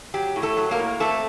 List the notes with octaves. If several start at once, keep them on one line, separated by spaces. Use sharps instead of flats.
F#3 G4
A2
A3 A4
F#3
A#3 A#4
A2
A3 C4 A4